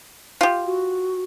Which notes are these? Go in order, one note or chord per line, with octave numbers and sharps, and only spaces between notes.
F4 G4
F#4